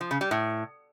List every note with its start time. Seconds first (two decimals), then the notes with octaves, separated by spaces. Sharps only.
0.01 F3
0.11 C#3
0.21 G3
0.31 A2